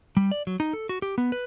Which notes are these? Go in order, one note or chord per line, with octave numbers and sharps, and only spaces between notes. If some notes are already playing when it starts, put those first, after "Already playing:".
G3
D5
F#3
D#4
A4
F#4
G4
B3
B4